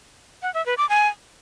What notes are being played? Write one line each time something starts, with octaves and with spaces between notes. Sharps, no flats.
F#5
E5
B4
D6
G#5